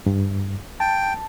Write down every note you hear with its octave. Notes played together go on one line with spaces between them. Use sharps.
G2
G5 A5